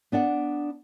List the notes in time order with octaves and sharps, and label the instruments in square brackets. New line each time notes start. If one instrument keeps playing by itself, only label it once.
[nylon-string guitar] B3 D4 D5 F#5